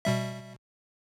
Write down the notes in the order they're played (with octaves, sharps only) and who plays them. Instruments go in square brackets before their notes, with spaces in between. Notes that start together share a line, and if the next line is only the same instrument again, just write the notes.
[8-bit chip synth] B2 G3 E5